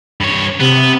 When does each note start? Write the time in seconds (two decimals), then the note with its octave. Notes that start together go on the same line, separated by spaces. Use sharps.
0.21 G2 C#5
0.60 C3 B3